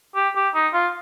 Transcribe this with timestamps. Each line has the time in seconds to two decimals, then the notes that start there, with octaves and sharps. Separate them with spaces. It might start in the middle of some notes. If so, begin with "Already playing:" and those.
0.16 G4
0.36 G4
0.54 D#4
0.74 F4